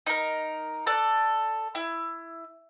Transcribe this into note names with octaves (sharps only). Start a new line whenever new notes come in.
D#4 A#4
A4 D5 F#6
E4